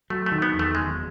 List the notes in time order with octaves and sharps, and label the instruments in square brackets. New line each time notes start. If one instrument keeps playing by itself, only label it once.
[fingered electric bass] F#3 [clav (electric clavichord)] A3
[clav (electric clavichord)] A3
[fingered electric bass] D#3
[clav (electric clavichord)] B3
[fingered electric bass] E2
[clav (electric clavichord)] A3
[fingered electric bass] F#1 [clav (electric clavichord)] G#3